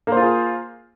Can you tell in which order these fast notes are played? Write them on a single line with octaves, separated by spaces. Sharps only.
A#3 C5 F4 G#4